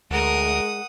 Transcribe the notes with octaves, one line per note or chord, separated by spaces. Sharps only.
D2 G#3 A#4 F#5 D#6